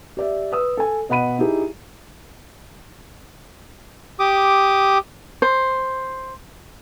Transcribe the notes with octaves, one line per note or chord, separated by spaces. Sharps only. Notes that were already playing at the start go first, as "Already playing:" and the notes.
G4 D5 E5
B4 D#6 E6
A4 G#5
B2 D#5 F#5 B5 D#7
D#4 E4 G4 G#4
G4 D6 D#6
C5